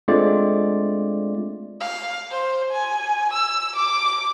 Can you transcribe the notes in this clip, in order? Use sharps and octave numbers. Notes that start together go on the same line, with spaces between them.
G#3 A3 C4 D4 F4 D5
F5
C5
G#5
E6
D6